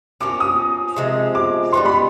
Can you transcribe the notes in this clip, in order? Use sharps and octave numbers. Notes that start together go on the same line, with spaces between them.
F3 A#3 C#4 D6
D#6
C3 F3 G#3
D6
G3 B3 D#4 G4 C6
B5